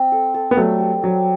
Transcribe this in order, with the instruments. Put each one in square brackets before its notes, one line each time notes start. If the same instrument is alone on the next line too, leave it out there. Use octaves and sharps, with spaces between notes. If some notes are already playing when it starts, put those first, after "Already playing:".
Already playing: [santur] C4
A4
A4
[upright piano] B3
[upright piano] F#3 A3 [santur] G3
[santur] G3
[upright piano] F#3 [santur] G4